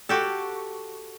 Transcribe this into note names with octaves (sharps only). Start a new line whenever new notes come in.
F#4 G4 A4